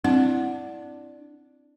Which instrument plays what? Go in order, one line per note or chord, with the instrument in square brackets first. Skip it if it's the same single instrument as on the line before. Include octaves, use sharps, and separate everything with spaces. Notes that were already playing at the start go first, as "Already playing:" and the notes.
[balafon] C4 E4 F#5 [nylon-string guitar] D4